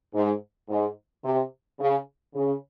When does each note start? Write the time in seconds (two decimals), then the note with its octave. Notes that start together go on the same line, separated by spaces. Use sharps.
0.14 G#2
0.68 G#2
1.23 C3
1.79 C#3
2.34 C#3